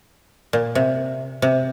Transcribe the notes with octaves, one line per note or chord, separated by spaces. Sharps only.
A#2
C3
C3